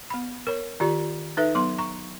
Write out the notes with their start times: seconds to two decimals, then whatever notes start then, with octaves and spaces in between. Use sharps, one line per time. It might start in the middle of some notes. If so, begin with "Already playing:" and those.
0.10 B3 B5
0.47 A#4 C#5
0.80 D#3 F4 G4 D5
1.37 D#4 A4 B4 E5
1.55 F#3 B3 C6
1.79 A#5 C#6